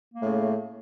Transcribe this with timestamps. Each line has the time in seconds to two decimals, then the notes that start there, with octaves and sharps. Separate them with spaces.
0.15 A#3
0.18 A3
0.22 A2
0.26 C#3